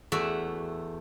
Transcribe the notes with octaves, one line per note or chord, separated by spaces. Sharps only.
E2 A3 F#4 D5 E5